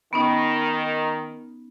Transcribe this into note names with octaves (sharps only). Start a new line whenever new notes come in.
D#3 B3 C#4 D#4